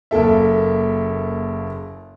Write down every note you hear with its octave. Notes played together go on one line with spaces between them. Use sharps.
F#1 A#3 A4 E5